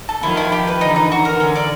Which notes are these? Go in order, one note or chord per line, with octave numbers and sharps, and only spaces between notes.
A4
D#3 F3 E4
E4
G4
B4
D3 E3 D#4
D#4
F#4
A#4
D3 C#4
D5